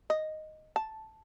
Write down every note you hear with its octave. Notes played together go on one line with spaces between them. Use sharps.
D#5
A5